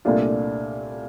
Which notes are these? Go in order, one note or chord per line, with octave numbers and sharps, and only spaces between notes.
C2 A#2 A3 D4 F4